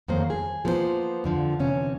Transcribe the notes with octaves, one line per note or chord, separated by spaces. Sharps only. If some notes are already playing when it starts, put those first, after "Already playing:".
F2 D#3 F#3 A#3 C5
G#4
F3 A#3 B3 A4 C5
F2 D3 F3
E2 C3 C#4